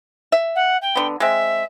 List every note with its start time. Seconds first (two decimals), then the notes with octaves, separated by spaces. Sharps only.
0.32 E5
0.55 F#5
0.82 G5
0.95 D3 B3
1.20 G#3 C4 E5